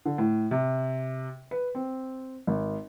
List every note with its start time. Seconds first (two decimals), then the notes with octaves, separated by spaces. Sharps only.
0.05 D3
0.18 A2
0.51 C3
1.51 B4
1.75 C4
2.47 G#1